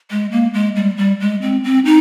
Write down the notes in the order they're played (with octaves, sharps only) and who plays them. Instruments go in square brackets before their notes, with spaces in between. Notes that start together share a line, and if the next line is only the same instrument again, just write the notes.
[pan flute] G#3
A#3
G#3
G3
G3
G#3
C4
C4
D#4